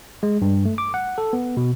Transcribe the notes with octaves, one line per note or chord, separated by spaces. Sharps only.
G#3
G2
A3
D6
F#5
A4
B3
B2